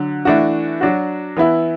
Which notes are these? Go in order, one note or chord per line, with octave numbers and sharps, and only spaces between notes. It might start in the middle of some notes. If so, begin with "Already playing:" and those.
Already playing: D3 F#3
E3 A3 D4 F#4
F#3 D4 F#4
E3 B3 E4